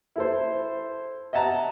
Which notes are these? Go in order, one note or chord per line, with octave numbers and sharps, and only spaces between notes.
E4 A4 C5
D#5 E5 F#5 A5 A#5